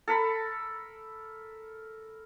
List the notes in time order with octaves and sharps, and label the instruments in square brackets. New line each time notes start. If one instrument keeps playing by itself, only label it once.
[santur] A4 A#4 B5